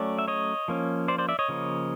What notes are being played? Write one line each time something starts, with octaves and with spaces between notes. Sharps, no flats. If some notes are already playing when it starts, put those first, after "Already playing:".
Already playing: F#3 A3 C#4 D5
E5
C#5 D#5
F3 A#3 C#4
C5 D5
C5 D5
D5 E5
C#5 D#5
C#3 F3 A#3